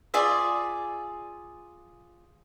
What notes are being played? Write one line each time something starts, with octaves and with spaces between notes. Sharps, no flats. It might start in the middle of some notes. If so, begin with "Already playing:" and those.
F4 G#4 D5 E5